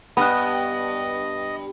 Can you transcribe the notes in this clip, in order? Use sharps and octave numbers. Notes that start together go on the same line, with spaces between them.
G2 B3 D#5 B5 F#6